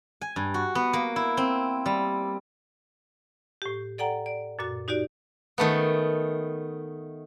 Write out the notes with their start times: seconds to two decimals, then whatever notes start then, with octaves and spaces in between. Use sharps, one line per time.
0.21 G#5
0.36 G2
0.54 F#4
0.75 B3
0.93 A#3
1.16 E4
1.37 C4
1.86 G3
3.62 A2 G4
3.98 A4 D5 F#5 G5 A#5
4.26 D5
4.59 F#2 A#2 F#4 A6
4.88 D#4 F#4 G4 D5
5.58 D#3 A3 B3